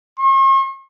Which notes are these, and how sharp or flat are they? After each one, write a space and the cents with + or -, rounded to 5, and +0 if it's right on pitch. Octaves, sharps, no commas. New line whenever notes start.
C#6 -45